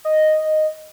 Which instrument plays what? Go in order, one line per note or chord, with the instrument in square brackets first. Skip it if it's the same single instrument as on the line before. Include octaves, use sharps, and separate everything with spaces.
[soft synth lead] D#5